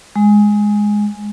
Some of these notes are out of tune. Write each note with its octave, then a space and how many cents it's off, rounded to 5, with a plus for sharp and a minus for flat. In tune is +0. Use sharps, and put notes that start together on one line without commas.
G#3 +0